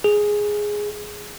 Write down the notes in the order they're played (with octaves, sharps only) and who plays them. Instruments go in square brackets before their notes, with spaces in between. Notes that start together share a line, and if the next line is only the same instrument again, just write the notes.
[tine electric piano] G#4